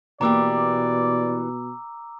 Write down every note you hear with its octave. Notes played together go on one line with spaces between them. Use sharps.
B2 E3 A#3 G4 D5 A#5 D6 E6